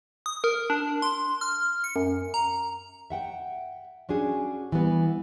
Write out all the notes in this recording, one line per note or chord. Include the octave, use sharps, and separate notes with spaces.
D#6
A#4
D4
C6
F6
C#7
F#2
A#5
E5 F#5 G5
C#4 D4 F#4 G#4
E3 G3 B3